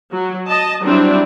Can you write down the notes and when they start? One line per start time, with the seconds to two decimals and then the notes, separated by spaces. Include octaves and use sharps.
0.12 F#3
0.48 D#5 A5
0.83 F#3 G3 C4 D4 E4